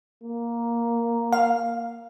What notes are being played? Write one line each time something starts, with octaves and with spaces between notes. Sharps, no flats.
A#3
F5